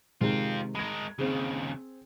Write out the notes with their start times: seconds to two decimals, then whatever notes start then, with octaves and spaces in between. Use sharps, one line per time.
0.21 C3 D#3 G#3 C4 F4
0.75 G#3 A#4 B5 G#6
1.19 D#2 C#3 C4 G#4